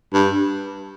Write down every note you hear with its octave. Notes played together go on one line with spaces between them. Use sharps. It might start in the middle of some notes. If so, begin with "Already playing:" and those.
G2